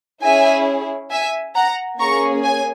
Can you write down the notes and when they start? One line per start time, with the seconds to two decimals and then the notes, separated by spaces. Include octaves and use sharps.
0.23 C#4 E4 G#4 E5 G#5
1.11 E5 G#5
1.55 F#5 A#5
1.99 A#3 C#4 G#4 A#5 C#6
2.44 G#5